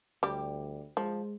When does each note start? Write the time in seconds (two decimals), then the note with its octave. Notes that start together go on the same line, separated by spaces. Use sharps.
0.23 D2 G3 G4
0.97 F3 G#3